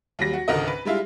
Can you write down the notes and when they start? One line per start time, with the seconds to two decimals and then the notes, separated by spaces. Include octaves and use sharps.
0.19 D#2 F#3 G3 A#6
0.33 F#4
0.48 G#1 C#2 D3 A#4 D#5
0.67 B4
0.85 G3 G#3 E4 F4